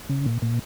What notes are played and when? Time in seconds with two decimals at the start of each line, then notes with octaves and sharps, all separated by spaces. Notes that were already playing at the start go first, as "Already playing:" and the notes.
0.09 C#3
0.26 A#2
0.42 A#2